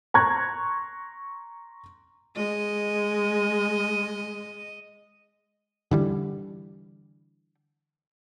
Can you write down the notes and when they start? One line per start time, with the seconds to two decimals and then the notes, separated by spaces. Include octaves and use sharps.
0.14 A#5 C6 C#6 F#6 G#6
2.37 G#3 D#5
5.91 D3 E3 G3